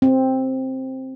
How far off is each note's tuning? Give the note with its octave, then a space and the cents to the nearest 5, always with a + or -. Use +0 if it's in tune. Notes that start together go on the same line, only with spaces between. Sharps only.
C4 +5